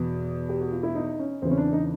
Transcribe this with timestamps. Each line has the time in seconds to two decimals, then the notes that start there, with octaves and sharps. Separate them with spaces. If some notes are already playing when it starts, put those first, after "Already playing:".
Already playing: E2 B2
0.49 G4
0.61 F#4
0.72 F4
0.83 E4
0.95 D#4
1.19 C#4
1.42 E2 C#3 E3 C4
1.51 C#4
1.58 D4
1.73 D#4